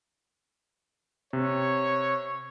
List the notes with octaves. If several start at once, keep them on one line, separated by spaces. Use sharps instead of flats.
C3 C#5